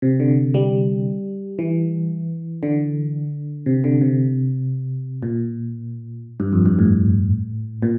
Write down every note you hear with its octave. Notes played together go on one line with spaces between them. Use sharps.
C3
D3
G3
E3
D3
C3
D3
C3
A#2
G2
F2
G2
A2
A#2